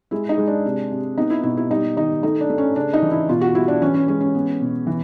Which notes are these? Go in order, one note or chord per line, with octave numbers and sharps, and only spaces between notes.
G#3 E4
D#4
G#3
D4
C3
C3
B3 D#4
E4
B2 E4
E4
G3 D#4
D#3 D#4
A3 D#4
D4
A3
C#4
C#3 D4
D#4
E3
E4
B2 F4
F#4
G3 E4
D4
E3 C#4
C#4
G#3 C#4
C#4
B3
B2
E3